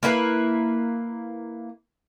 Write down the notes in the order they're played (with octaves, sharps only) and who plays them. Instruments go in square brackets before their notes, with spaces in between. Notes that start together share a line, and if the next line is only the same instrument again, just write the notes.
[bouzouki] A#3 E4 F#4 B4